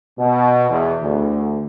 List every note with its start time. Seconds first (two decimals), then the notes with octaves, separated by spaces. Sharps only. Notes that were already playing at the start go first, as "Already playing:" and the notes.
0.19 B2
0.70 E2
1.02 D2